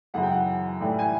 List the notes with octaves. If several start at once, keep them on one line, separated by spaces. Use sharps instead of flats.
F#2 C#3 E3 F#5
G5
F#5
A2 E3 G3
G#5